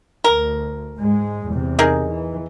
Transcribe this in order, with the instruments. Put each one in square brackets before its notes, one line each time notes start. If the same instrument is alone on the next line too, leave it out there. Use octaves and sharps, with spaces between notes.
[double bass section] D2 [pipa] A#4
[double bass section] G#2 G#3
E2 C3
[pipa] D#4 G#4 A#4
[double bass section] E3